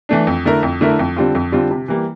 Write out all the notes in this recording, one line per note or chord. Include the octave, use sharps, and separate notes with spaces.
E3 A3 D4
F2
D3 A3 E4 A#4
F2
D3 A3 E4 A#4
F2
D3 G3 C4 F4
F2
D3 G3 C4 F4
C3
E3 G3 A#3